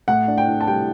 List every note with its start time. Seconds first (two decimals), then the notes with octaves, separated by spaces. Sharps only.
0.08 A2 F#5
0.28 D4
0.38 G5
0.48 D4
0.61 A5
0.67 G3 G5